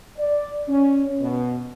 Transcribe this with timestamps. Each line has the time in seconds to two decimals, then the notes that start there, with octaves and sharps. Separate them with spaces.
0.18 D5
0.67 C#4
1.20 B2